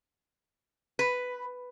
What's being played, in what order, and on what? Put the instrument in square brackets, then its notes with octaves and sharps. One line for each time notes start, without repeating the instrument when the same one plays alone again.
[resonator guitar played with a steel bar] B4